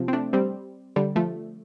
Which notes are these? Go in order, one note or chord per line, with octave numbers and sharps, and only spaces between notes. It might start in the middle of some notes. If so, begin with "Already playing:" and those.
Already playing: C3 F3
C4
A3 D4
G3 C4
D3 G3
F3 A3